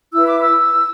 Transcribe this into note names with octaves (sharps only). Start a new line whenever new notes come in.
E4 B4 E6
D6
E6